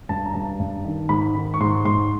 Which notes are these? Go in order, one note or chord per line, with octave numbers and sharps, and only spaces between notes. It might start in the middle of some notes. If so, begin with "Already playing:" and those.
G2 A5
A#5
G2 A5
G2
D#3
G#2 B5
D#3
C#6
G#2 C6
G#2 C6